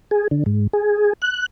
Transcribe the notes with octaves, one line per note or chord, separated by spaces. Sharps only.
G#4
D3
G#2
G#4
F#6